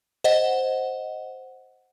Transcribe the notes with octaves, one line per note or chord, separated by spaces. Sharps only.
C5 D#5 F#5